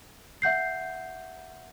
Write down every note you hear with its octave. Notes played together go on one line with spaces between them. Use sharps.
E5 F#5 G6 C7